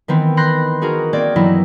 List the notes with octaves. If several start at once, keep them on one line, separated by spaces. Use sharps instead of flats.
D#3 E3 B3 C4
B5 C6 F#6 G6 A#6 C7
D#4 F#4 G#4 A#4
A#3 C4 D5 G#6
G2 E3 F#3 B3 D#4 E4